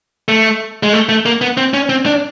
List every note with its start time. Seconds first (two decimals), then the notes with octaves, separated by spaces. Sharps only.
0.28 A3
0.83 G#3
0.93 A3
1.09 A3
1.26 A#3
1.41 B3
1.57 C4
1.74 C#4
1.89 C4
2.06 D4